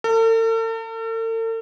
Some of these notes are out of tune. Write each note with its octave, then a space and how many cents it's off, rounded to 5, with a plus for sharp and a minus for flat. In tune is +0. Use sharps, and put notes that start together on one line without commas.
A4 +45